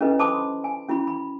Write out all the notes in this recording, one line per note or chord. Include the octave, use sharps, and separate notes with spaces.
C#4 D4 E4 A4 B4 D#5
C5 A5 B5 C6 D6 D#6
C6
G#5
C#4 E4 F#4 B5
B5